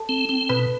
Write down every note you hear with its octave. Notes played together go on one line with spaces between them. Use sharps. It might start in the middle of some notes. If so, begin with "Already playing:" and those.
Already playing: A4 A5
C4
C4
B2 B4 B5